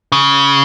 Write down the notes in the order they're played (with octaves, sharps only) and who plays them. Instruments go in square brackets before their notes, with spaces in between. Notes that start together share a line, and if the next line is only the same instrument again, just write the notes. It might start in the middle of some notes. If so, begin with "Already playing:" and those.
[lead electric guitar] C#3